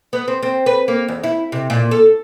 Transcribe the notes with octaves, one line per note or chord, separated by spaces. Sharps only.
B3
C4
C4
B4
A#3
E2
E4
C3
A#2
A4